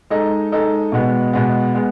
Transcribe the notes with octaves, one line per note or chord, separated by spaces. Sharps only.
G#3 D#4 A4 D#5
G#3 D#4 A4 D#5
B2 G#3 B3
B2 G#3 B3
G#3 B3